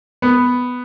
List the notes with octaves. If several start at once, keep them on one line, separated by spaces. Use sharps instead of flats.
B3